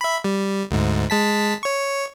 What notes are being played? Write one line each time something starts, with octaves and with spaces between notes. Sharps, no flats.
E5 B5
G3
D2 G#2
G#3 A5 B6
C#5 C#6